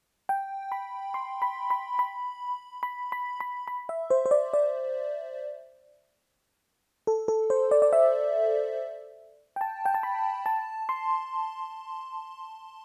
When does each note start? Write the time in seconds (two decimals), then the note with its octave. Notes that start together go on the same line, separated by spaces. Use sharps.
0.29 G5
0.72 B5
1.14 C6
1.42 B5
1.70 B5
1.99 B5
2.83 B5
3.12 B5
3.40 B5
3.68 B5
3.89 E5
4.10 C5
4.26 C5
4.31 D5
4.54 D5
7.07 A4
7.28 A4
7.50 C5
7.71 D5
7.82 D5
7.93 E5
9.56 G5
9.61 A5
9.86 G5
9.94 A5
10.03 B5
10.46 A5
10.89 C6